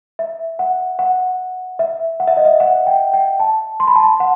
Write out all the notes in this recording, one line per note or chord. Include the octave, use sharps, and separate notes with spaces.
E5
F#5
F#5
E5
F#5
E5
D#5
E5
F#5
G5
G5
A5
C6
B5
A5
B5
F#5